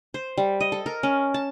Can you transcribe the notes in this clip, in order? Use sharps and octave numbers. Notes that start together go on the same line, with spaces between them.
C5
G3
D#5
A4
A#4
C#4
A5